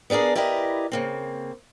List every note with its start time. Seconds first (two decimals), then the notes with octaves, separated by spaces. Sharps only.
0.10 B3 D4 G#4 A#4 D5
0.35 E4 G4 A#4 B4 D5 D#5
0.92 C#3 A#3 C4